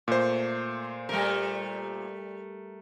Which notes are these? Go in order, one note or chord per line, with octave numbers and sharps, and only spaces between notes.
A#2 A3 C5
G3 A3 A#4